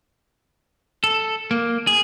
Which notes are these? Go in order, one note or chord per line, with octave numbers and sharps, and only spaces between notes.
A4
A#3
G#4